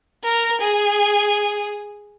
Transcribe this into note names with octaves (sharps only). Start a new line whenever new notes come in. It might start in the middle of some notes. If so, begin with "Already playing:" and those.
A#4
G#4